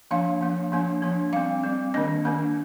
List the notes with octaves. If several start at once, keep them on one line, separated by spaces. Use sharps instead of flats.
F3 A#3 D4 F5
F3 A#3 D4
F3 A#3 D4
F3 A#3 D4
G3 C4 F5
G3 C4
D#3 A#3 D4 D#5
D#3 A#3 D4